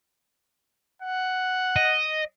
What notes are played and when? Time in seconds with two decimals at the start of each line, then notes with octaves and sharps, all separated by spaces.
1.02 F#5
1.76 D#5